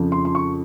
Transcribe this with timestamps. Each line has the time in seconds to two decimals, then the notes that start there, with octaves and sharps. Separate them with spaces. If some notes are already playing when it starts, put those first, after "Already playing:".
Already playing: F2 C#3 F3
0.12 C6
0.25 C6
0.35 C#6